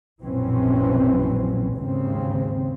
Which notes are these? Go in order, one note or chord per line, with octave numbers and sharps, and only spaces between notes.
A#1 F#2 B2 E3 C4 C#4
G#1 D#2 C#3 C4